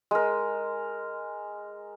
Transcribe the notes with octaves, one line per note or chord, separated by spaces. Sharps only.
G#3 A#4